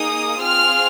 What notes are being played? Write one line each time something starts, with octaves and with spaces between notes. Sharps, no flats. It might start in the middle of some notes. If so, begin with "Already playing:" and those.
Already playing: A#3 D#4 G#4 D#6
C4 F4 G#4 F6